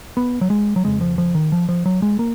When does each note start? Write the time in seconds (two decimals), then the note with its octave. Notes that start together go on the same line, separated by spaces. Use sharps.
0.17 B3
0.41 F#3
0.50 G#3
0.76 F#3
0.84 F2 C#3 G#3
1.01 F3
1.18 F3
1.35 D#3
1.52 F3
1.69 F3
1.86 F#3
2.02 G#3
2.19 A#3